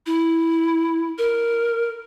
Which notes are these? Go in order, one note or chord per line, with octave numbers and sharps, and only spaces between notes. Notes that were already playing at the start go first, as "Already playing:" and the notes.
E4
A#4